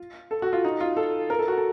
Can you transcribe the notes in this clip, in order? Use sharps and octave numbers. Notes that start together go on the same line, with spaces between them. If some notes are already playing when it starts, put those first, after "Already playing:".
Already playing: F4
A4
F#4
F4
D#4
F4
A4
A#4
A4
F#4
A4